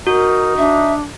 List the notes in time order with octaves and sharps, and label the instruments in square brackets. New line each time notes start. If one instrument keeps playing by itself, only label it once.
[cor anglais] D#4 [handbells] F#4 [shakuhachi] A#4
[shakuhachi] D4 [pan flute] E5